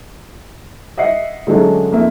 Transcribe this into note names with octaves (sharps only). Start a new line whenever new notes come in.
D#5 E5 F#5 C7
D3 F#3 G#3 A3 C#4
F2 A#3 E5